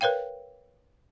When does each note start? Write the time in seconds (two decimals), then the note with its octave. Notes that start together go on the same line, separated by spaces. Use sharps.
0.01 A#4 B4 C#5 F5 G5